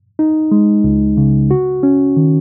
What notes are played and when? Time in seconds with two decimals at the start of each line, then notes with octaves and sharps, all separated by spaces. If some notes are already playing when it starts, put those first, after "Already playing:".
0.19 D#4
0.52 G#3
0.84 C#2
1.17 C#3
1.51 F#4
1.83 C#4
2.17 D#3